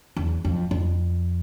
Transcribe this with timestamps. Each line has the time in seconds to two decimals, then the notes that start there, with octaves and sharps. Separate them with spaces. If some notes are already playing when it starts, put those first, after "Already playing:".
0.16 E2
0.45 F2
0.71 F2